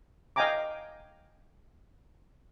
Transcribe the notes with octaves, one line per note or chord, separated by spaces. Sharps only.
D#5 F5 G5 G#5 A#5 D6